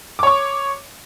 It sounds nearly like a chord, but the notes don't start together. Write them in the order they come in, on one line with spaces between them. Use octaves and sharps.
D6 C#5 C#6